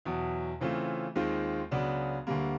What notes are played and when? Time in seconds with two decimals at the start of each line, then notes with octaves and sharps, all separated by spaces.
0.05 E2 B2 F#3
0.61 C#3 E3 A3 C4 F4
1.16 D#2 D#3 G#3 C4 F4
1.71 C#2 C#3 F#3 B3 D4
2.27 D2 D3 G3 A#3